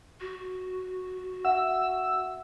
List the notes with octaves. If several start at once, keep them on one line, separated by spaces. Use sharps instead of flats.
F#4
E5 F#5 E6